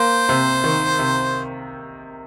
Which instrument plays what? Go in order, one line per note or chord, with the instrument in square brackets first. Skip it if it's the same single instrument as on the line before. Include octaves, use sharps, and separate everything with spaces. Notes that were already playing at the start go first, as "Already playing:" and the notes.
Already playing: [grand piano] A#3 [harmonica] C5
[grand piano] C3
D#3
C3